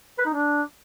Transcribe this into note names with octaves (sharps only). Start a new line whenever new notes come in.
B4
D#4
D4